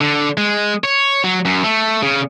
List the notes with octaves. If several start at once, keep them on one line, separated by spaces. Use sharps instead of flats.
D3
G#3
C#5
F#3
F#2
A3
C#3